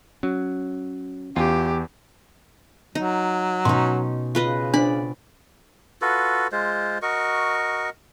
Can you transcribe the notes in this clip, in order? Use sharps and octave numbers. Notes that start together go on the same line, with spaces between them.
F#3 C#4
E2 F4 G4
F#3 D#4
B2 C#4 D#4 C6
C#3 F4 B4 D#5
D4 C5 D5 B5
F4 F#4 A4 B4
G#3 F4 C5
F#4 A#4 D#5 C#6